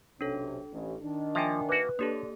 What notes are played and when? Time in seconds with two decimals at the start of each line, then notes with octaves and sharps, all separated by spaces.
0.21 B1 C3 C#4 D4 A4
0.72 A1
1.03 D#3 D4
1.35 F3 A#3 E5 G5 G#5
1.69 A#3 F#4 B4
1.99 A#3 D4 G4 A4 C#5